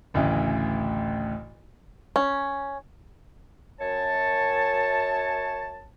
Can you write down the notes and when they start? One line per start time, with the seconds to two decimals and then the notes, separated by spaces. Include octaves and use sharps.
0.14 A1 D2 C#3 E3
2.16 C#4
3.81 F#2 C#5 A5